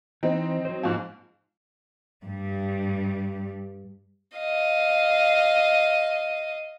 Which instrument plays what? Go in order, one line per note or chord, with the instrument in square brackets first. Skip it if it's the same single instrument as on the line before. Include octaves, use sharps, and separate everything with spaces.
[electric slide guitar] E3 [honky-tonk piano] C4 D#4
[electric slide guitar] F#3 C5
[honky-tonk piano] G#2 F3
[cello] G2 G3
[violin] D#5 F5